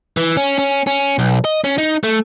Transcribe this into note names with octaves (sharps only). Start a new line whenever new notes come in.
E3
C#4
C#4
C#4
B1
D#5
C#4
D#4
A3